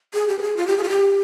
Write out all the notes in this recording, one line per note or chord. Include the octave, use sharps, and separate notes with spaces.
G#4
G4
B4
G#4
F4
G4
G#4
F4
G4